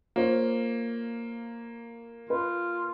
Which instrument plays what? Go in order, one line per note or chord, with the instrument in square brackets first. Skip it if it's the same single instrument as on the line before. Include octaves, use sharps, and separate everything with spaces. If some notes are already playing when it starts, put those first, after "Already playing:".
[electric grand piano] A#3 [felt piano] F4 C5 C#5
[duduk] F4 [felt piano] B4